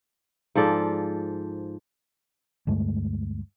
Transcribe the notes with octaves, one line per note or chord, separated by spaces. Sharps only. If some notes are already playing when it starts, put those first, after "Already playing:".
G#2 F3 A4 D5
D2 G2 G#3 A3